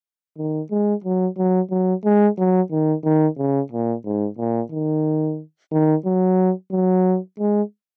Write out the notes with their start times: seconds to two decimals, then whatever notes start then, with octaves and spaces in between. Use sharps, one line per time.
0.38 D#3
0.71 G#3
1.04 F#3
1.37 F#3
1.71 F#3
2.05 G#3
2.38 F#3
2.71 D#3
3.04 D#3
3.38 C#3
3.72 A#2
4.05 G#2
4.38 A#2
4.71 D#3
5.71 D#3
6.05 F#3
6.71 F#3
7.39 G#3